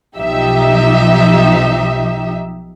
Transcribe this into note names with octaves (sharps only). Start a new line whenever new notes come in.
B1 F3 D#4 G4 E5